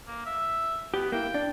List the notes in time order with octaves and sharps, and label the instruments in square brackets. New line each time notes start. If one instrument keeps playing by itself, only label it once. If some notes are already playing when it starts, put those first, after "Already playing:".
[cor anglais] A#3
E5
[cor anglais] B3 [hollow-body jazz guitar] G4
[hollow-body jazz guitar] A#3 E4 [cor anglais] G5
[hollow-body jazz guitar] D4